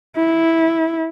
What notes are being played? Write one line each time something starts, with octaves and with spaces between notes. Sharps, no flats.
E4